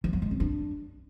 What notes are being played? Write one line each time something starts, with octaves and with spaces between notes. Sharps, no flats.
E3
F#3
G#3
C#4
D4